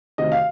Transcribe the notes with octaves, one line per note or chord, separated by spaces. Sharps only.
D2 C3 D#3 D#5
F5